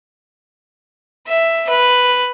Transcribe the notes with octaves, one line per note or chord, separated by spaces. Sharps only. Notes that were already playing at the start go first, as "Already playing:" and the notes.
E5
B4